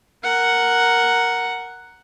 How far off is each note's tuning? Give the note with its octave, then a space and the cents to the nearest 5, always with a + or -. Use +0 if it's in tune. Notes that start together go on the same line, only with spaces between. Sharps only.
A#4 +0 F#5 +0